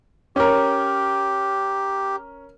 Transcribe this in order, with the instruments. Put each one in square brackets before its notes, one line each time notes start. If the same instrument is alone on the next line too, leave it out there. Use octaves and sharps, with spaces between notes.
[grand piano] C#4 A#4 [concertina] G4